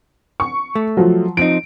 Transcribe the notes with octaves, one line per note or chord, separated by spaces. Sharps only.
C#6
A3
F3 F#3
F3 C4 D#4 D7